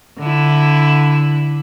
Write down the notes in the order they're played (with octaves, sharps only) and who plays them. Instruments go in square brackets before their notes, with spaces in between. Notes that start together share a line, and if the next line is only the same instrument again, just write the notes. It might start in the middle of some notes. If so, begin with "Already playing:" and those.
[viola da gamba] D3 E4